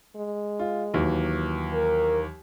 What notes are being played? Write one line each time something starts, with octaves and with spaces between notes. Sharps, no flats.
G#3
F4
D#2 E3 F#3
A#4